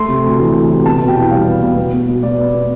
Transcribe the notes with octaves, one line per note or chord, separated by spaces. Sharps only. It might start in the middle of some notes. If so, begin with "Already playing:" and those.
Already playing: A3 C6
C3
D2
E3
A3
C3
B3 A5
B2
G5
E2
G3 F5
B3
B2
B3
B3
B2
B2 D5
B3
B3